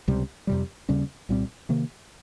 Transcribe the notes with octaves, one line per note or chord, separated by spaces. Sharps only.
C#2 C3 G3
F2 C3 G3
D#2 C#3 G3 C#4
C2 A#2 G3 C4
C3 D#3 A#3